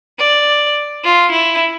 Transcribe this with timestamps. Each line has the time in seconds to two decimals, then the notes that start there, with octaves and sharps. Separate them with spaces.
0.19 D5
1.04 F4
1.32 E4